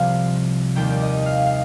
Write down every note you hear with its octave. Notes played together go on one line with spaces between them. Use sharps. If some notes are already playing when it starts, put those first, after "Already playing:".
Already playing: C2 C3 F3 F5
D#2 D#3 G3 G5
D5
D#5
F5
F5